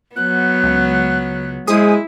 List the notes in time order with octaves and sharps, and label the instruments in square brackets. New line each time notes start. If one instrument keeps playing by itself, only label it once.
[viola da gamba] F#3 B3 [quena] F#6
[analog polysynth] C#2
[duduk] G#3 [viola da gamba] E4 [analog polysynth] G#4 D#6 [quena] C5